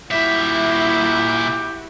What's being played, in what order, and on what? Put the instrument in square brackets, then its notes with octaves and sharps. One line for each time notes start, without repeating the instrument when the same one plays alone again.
[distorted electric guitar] A#2 E5 [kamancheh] E4 F#4 [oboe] G4